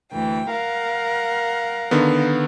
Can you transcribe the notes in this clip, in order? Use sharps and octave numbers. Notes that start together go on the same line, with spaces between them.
D2 E3 G5
A#4 F5 F#5
D3 D#3 B3